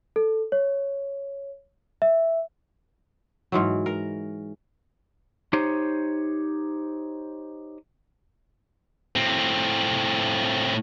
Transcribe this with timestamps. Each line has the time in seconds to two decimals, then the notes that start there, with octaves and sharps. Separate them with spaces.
0.16 A4
0.52 C#5
2.02 E5
3.52 G#2 E3 F#3
3.86 A#4
5.53 D#4 G4 C5 C#5
9.16 A2 C4